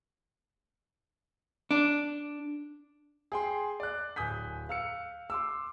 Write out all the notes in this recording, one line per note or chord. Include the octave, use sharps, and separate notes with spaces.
D4
G#4 G5 C6
D5 F#6
D1 G#5 D#6 G6 B6
F5 E6 C#7
C6 D6 E6